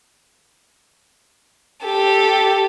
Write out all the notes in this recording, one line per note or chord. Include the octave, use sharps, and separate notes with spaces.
G4 A4